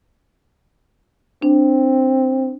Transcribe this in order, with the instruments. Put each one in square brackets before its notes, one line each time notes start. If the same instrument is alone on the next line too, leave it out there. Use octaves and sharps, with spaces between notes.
[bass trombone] C4 [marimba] D4